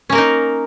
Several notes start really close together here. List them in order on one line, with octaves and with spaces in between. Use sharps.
C#4 A#3 A#4 D#4